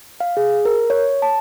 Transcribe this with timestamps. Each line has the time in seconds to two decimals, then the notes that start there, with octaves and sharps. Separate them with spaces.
0.20 F5
0.37 G#4
0.65 A#4
0.90 C#5
1.22 A5